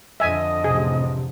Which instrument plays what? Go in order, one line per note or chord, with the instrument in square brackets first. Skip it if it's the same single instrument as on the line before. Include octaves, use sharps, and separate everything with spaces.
[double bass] F2 D3 [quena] D#5 [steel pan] E5 G#5
[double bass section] A1 C3 [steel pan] G#4